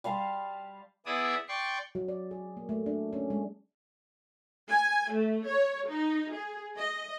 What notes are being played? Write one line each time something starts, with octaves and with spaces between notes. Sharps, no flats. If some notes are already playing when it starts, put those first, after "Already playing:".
G3 F5 A5 C6
B3 E4 G#4 D5 E5 D#6
D5 G5 C6 C#6
F#3
D5
G#4
A#3
A3
D4
C#4
G#3
G#5
A3
C#5
D#4
G#4
D#5